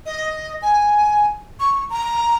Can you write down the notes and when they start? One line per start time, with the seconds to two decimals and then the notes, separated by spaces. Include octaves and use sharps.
0.06 D#5
0.62 G#5
1.60 C#6
1.90 A#5